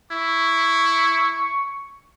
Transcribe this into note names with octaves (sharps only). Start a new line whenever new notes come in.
E4 C#6